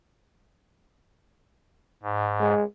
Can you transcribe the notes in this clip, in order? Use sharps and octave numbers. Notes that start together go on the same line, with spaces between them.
G#2
G#3